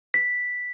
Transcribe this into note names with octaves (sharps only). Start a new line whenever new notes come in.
B6